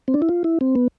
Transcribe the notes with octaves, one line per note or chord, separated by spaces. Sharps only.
C4
D4
E4
F4
E4
C4
B3